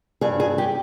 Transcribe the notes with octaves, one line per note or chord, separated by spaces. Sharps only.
G2 G#4
G#4
G4